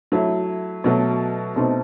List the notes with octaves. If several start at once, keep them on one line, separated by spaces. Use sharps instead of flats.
F#3 A3 E4
B2 F#3 A3
B2 A3 C4 D#4